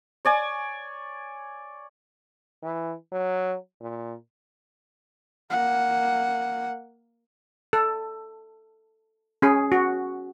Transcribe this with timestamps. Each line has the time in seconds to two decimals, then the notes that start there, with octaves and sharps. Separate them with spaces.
0.25 C#5 D5 G#5
2.63 E3
3.12 F#3
3.81 A#2
5.50 A#3 F#5
7.73 A4
9.42 C#4 G#4
9.72 F#4